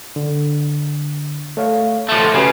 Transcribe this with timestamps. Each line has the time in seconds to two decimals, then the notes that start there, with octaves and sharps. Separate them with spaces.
0.16 D3
1.57 A3 C#5 F5
2.09 F3 A3 A6
2.34 C#3 F#4 G4 B4